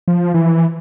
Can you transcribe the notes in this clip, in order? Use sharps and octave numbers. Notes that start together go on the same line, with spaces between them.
F3
E3